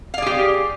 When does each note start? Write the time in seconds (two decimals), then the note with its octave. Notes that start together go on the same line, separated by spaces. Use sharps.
0.14 F5
0.18 D5
0.22 G#4
0.26 G4